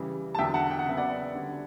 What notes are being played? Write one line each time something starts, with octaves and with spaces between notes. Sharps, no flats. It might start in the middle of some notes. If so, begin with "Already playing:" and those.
Already playing: C#3 E3 G3
A5
E2 D3 F#3 E5 G5
F#5 A5
G5
F#5
C#3 F#3 B3 E5
D5 F#5
D3 G3 C#4